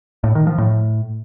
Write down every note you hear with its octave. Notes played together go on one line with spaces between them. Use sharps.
A2
D#3
F3
A2